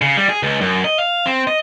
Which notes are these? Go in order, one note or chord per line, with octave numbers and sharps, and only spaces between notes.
C#3
G3
G#4
C#2
F#2
D#5
F5
C4
D#5